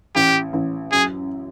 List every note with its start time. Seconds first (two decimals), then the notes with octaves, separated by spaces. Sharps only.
0.15 A1 G4
0.53 A1
0.92 F#2 G#4